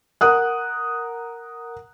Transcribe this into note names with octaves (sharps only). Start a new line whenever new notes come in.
A#4 F#5 D#6 F#6